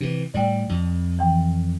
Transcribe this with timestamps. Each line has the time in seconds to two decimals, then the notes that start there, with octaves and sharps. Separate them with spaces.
0.01 C3 E3
0.34 A2 G3 D5 G5
0.69 F2
1.19 E3 G5